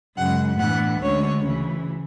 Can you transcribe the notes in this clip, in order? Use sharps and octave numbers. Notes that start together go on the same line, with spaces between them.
F#2 C#3 G#3 F#5
A2 E3 B3 D4 F#5
D2 D3 G#3 C#4 C#5
D2 C#3 E3